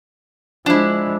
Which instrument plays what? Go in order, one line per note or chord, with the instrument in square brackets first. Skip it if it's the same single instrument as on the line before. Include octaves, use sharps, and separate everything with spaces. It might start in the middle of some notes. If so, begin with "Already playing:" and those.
[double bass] F3 G#3 [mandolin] D4 E4